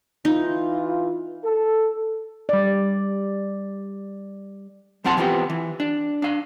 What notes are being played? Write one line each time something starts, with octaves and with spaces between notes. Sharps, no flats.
E3 D#4 F4
A4
G3 D5
B1 F3 C4 F#5 A5 C6
E3 F3 B3 C4 G4
E3
D4
D4 F5